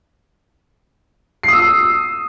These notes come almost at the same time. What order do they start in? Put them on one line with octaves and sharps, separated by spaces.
C7 D#6 E6